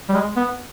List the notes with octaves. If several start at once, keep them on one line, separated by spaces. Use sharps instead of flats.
G3
G#3
B3